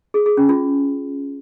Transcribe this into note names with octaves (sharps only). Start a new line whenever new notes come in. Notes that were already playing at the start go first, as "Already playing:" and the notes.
G#4
G#4
C#4
F4